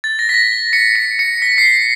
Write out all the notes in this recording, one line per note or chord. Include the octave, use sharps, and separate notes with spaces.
A6
A#6
B6
A#6
C#7
C#7
C#7
B6
C7
B6